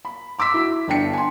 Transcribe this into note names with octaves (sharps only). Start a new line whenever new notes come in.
B5
C6 D6 E6 B6
E4 F#4
G1 D4 G5 C#7
G#5 C6